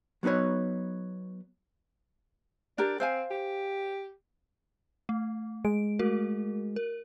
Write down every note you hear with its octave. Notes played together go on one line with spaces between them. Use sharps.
F#3 B3 D#4 B4 C#5
D4 G4 A#4 D5
C4 C5 F5 G#5
G4
A3
G#3 D7
A3 F#4 A#4
A#4